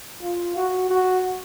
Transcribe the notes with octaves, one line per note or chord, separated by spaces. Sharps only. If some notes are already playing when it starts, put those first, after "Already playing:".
F4
F#4
F#4